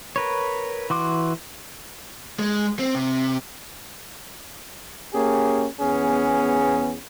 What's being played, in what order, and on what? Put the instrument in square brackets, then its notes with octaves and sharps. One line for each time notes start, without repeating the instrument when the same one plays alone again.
[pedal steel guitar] A#4 B4 C#5
E3 F#4 C6 D6
[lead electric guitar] G#3
C4
C3
[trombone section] A#3 C#4 G4 G#4
E2 B3 C#4 G#4